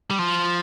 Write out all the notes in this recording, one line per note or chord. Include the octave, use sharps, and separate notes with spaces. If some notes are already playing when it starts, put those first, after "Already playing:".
G3
F3